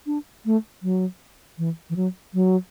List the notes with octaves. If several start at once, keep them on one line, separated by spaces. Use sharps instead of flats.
D4
A3
F#3
E3
E3
F#3
F#3